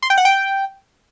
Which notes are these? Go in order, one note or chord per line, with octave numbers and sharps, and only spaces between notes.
C6
G5
F#5
G5